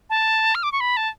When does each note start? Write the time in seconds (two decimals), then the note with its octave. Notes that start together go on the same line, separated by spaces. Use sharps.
0.10 A5
0.55 F6
0.63 D6
0.72 C#6
0.80 B5
0.97 A5